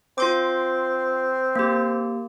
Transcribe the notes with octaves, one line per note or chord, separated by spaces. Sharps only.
C4 F4 C6 D6
A#3 G4